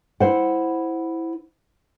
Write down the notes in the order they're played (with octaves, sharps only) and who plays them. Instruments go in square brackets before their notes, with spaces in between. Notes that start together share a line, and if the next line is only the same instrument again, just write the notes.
[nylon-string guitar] E4 C5 F#5